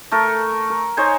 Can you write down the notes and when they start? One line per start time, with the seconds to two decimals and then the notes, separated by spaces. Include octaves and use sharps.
0.11 A3 A4 A#4
0.70 A#4
0.97 D#4 C5 C#5 G#5